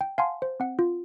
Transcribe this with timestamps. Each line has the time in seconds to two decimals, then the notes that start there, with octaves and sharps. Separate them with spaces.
0.01 G5
0.18 F5 F#5 G#5 A5 C6
0.42 C5
0.60 C4 F#5
0.79 F4